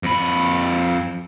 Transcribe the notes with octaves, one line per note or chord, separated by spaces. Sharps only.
F2 B5